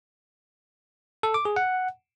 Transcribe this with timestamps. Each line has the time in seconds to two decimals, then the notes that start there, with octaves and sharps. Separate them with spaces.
1.23 A4
1.34 D6
1.45 G#4
1.56 F#5